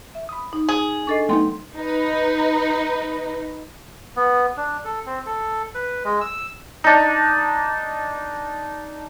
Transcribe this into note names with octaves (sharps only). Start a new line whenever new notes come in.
E5
B5 D#6
D#4
G#4
D4 A4 D#5 C#6 A6 C7
F#3 A3 B3 D#4 G5 C6
D#4 B4
B3
D4
A4
C4
A4
B4
G#3
E6
D4 D#4